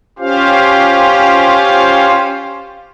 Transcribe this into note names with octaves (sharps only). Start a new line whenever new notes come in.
C#4 F4 G4 C5 F5